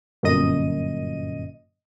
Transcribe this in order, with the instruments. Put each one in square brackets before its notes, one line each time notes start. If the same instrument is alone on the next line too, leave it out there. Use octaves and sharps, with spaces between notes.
[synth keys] G1 F#2 A#2 D#5 D#7